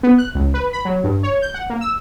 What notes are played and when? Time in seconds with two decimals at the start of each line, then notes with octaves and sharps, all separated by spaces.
0.03 B3
0.18 F#6
0.35 C#2
0.54 B4
0.73 B5
0.85 F#3
1.04 G2
1.23 C#5
1.42 G6
1.54 F#5
1.70 A#3
1.81 E6